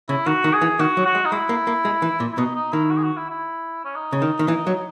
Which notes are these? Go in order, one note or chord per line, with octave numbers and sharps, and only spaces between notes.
C#3 E4
D#3 F#4
D#3
G#4
E3
D#3 F#4
F#3
F#4
G#3
D#4
G#3 E4
A#3
A#3
G#3
E3
A#2
E4
B2 D#4
D#4
D#3 E4
F#4
G#4
F#4
E4
E4
C#4
D#4
C#3
D#3
D#3
E3
F#3